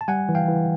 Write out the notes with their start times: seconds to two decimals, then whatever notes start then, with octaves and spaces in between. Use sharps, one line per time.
0.01 A5
0.08 G3 F#5 G#5
0.29 E3
0.35 F5 G5
0.48 E3